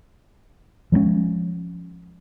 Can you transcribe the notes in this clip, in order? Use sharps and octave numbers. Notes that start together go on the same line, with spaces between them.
F3 G#3 A#3 C#4